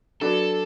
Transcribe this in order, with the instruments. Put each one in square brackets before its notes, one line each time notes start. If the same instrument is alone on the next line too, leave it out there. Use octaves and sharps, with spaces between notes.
[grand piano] F#3 D4 B4 [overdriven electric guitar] A4